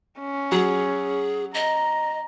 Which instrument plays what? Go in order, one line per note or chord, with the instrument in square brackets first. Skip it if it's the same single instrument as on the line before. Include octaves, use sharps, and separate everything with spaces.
[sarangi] C#4
[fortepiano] F#3 [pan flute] G#4
[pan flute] D#5 [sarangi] A#5